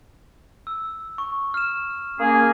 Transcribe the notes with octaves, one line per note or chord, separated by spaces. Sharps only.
E6
C#6
F6 E7
A#3 C#4 G#4